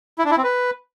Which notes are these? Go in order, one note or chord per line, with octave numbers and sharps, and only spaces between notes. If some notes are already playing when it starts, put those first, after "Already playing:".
E4
D4
E4
C4
B4